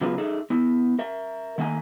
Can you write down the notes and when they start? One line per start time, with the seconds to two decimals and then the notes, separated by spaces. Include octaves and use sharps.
0.01 C#3 F#3 B3 F4 G#4 B4
0.18 D#4 G#4 A4 E5
0.50 B3 E4
0.99 A#4 E5
1.58 D#3 A3 A#3 F5 G#5